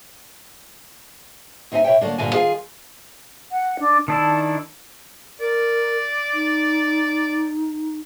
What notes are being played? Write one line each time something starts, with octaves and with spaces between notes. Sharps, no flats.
D#2 C4 D#4 E5 G#5
B2 C#5 E5 G5
D3 F#3 A3 A#3 D4
G2 A#2 D3 A#3 G#5
D#3 F4 G#4 D5 F5 G#5
F#5
D4
D#3 D4 E4 A5
A#4 D5
D#4